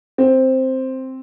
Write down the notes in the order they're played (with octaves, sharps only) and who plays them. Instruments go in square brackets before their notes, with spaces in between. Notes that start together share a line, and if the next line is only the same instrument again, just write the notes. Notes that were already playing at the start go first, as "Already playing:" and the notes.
[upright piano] C4